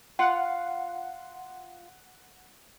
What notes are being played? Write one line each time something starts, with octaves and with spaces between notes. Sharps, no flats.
F4 F#5